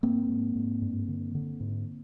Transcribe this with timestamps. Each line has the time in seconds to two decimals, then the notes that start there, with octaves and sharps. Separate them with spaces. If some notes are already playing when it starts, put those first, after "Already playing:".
0.03 G#2 A#3 C4
0.29 G#2
0.56 G#2
0.82 G2
1.08 D3
1.35 D3
1.60 G#2